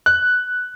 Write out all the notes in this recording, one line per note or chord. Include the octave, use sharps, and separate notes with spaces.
F#6